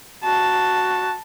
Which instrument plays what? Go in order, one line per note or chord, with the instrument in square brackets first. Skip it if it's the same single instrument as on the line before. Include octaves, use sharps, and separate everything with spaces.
[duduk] F#4 [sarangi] A5